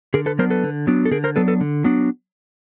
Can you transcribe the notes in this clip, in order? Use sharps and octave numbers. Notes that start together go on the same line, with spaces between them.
D3 G#4 A#4
A4 B4
F#3 B3 D4 A#4 C5
A4 B4
D3
F#3 B3 D4
A4
D3 G#4 A#4
A#4 C5
F#3 B3 D4 A4 B4
A4 B4
D3
F#3 B3 D4